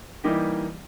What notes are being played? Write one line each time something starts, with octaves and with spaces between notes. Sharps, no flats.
E3 G3 A#3 D#4 G4